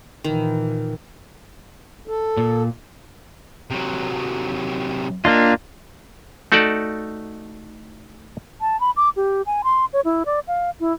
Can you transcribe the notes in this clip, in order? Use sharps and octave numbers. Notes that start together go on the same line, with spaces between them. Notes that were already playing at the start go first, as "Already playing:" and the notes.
A#2 D#3 E3
A4
A#2
C3 F#3
A#3 D4 F4 D#5 F5
A3 D#4 F#4 A4 D5
A5
B5
D6
G4
G#5
C6
C#5
E4
D5
F5
E4